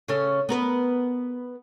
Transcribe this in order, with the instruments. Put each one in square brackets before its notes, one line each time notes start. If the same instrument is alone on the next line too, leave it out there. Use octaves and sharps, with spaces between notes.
[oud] C#3 C#4 A4
B3 A#4 B4